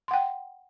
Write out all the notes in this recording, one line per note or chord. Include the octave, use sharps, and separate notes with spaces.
F#5 G5 C6